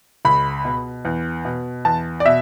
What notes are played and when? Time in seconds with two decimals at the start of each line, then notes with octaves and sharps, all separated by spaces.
0.25 C#2 B5
0.65 B2
1.05 E2
1.45 B2
1.85 E2 A5
2.20 D5
2.26 B2 E5